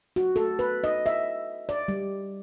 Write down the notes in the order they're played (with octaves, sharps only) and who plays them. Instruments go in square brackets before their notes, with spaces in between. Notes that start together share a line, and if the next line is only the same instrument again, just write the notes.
[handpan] F#4
A4
B4
D#5
E5
D5
G3